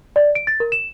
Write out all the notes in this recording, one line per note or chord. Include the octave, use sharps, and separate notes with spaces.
D5
D7
A6
A#4
E7